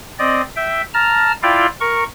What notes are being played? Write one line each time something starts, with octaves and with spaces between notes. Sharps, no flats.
C4 D5 D#5
E5 G5
A5 A#5 F6
E4 F4 D5 F5 G5
A#4 C#6